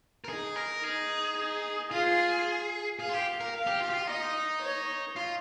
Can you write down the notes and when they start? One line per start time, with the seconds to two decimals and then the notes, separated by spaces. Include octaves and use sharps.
0.24 A#4
0.29 D#4 G#4
0.56 A#4
0.83 D#4 G#4
1.37 D#4
1.91 F4 G#4
2.99 G#4 F5
3.09 F4
3.14 G4
3.41 A#4
3.54 F5
3.67 G4
3.81 F4
3.90 G4
3.94 F4
4.07 D#4 D#5
4.61 C#5
5.16 F4